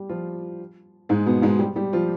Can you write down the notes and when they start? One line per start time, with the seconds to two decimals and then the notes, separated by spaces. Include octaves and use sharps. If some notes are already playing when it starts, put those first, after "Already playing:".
Already playing: G3 G4
0.09 F3 F4
1.09 G#2 G#3
1.26 B2 B3
1.42 G#2 G#3
1.59 G3 G4
1.76 G3 G4
1.93 F3 F4